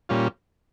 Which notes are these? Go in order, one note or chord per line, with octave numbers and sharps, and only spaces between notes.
A#2 G3 C#4 F4